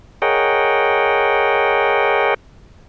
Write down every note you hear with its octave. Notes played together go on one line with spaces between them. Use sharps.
G#4 A#4 C#5 D#5 F#5 G5